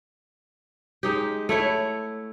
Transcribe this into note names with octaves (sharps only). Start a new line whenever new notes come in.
G#3 D#4 G4
A3 E4 C#5